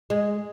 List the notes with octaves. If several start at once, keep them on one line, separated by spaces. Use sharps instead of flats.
G#3